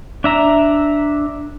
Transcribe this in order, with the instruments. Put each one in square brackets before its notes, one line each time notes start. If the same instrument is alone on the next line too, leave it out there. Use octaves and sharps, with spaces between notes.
[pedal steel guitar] D4 E5 A#5